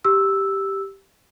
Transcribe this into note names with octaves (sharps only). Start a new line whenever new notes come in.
G4 E6